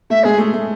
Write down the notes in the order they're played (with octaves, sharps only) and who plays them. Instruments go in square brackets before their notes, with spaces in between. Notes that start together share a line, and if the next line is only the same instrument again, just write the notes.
[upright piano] A3 [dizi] E5
[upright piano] G#3 [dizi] G#4
[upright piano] A3
A3